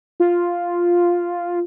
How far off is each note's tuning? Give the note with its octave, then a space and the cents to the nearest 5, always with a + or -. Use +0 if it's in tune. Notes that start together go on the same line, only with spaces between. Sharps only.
F4 +0